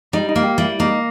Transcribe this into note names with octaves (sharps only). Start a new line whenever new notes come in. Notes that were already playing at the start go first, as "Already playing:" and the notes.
G3 D#4
D#4
A#3
G4
G3 E4
A#3 D#4